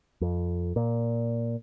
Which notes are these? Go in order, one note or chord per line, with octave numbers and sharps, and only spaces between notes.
F2
A#2